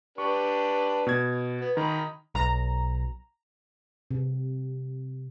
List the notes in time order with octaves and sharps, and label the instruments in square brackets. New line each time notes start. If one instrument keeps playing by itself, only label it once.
[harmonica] D4 G4 B4 [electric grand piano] C#6
[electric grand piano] B2 G#6
[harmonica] B3
[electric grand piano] D#3 [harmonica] D#5 A#5 B5
[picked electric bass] B1 [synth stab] A#5
[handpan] C3